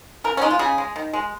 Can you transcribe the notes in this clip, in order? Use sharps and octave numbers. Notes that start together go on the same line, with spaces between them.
C#3 A#4
C#4
G#3 D#4
F4
C#3 G#4
G#3
D#3
G#3